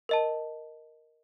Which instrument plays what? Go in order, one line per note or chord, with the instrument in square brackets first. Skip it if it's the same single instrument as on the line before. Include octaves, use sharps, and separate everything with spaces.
[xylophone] A#4 D#5 A5